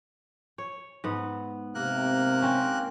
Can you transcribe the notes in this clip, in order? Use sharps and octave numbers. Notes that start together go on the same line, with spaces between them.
C#5
G#2 B3
C3 A#3 A#4 F#6
C4 C#4